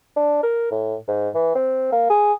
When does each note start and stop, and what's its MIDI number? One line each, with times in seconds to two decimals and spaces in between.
0.17 0.38 62
0.43 0.71 70
0.71 0.96 45
1.08 1.29 44
1.35 1.54 52
1.55 1.90 60
1.92 2.08 58
2.10 2.33 68